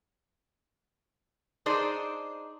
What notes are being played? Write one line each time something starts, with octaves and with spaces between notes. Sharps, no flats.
D4 D#4 G#4 C5 D5 D#5